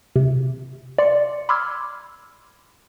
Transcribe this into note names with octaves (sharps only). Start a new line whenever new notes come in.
C3
D5 C6 C#7
B5 C6 D6 E6 F6 G#6